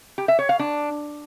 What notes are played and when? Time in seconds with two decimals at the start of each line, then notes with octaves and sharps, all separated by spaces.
0.18 G4
0.28 E5
0.39 C#5
0.49 F5
0.59 D4